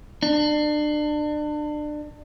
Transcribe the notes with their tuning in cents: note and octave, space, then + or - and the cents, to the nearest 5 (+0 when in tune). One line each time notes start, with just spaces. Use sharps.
D4 +30